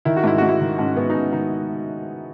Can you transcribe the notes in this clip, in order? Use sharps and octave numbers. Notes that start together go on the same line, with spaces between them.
D#3 E4
F#4
G#2 E4
G#2 F#4
E4
D#3
G#2 C#4
G#2 B3
D#4
G#2 C#4
D#3 D#4